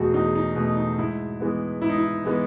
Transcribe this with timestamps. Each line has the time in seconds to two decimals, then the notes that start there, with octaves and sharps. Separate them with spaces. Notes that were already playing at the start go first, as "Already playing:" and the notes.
Already playing: E2 B2 A3 F#4 G#4
0.14 E2 D#4
0.35 D#4
0.56 B2 A3
0.77 D#4
0.98 G#2 E4
1.40 E3 G#3 B3
1.81 G#2 E4
1.89 D#4
1.98 E4
2.25 E3 G#3 B3